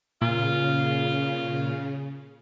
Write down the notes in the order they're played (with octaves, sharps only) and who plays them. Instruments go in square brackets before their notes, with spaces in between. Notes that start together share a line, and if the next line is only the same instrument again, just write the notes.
[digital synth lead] A#2 [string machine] C#3 [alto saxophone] F4